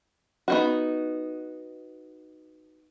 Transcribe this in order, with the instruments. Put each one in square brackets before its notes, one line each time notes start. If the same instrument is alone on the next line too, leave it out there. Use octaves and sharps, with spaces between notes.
[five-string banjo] B3 D#4 F#4